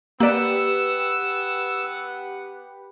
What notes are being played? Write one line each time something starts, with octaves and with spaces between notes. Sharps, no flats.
A#3 B3 G4 B4 D5 F#5 E6